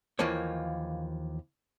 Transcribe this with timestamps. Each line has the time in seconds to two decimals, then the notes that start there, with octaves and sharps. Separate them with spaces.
0.19 D#2 E3 F3 A#3 C#5